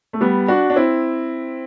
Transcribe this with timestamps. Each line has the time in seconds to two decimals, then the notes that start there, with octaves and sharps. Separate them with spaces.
0.13 A3
0.21 G3 B3
0.48 D4 F#4
0.70 D4
0.76 C4 E4